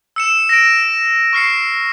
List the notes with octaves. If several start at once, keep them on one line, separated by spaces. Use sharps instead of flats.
E6 C#7 E7
A#6 D7
C#6 F6 C7 C#7